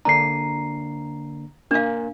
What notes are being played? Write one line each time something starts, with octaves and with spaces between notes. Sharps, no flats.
D3 A#3 D4 A#5 C7
A#3 D4 A#4 F5 G#5